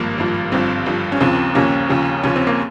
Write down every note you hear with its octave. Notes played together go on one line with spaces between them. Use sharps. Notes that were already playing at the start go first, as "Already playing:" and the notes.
Already playing: G#1 G2 F3 A#3
G#1 G2 F3
G1 G2 F3 C4
G1 G2 F3
C#4
D#2 C#3 F3 C4
D#2 C#3 F3 A#3 C#4
D#2 C#3 F3
D#2 C#3 F3 C#4
C4
A#3